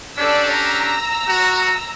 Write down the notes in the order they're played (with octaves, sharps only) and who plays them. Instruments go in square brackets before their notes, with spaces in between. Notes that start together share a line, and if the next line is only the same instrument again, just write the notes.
[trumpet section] C#4 D4 G4 [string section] A4 D5 E6
[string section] A#5 E6
[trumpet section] F#4